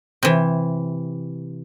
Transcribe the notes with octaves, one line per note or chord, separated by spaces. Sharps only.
C3 E3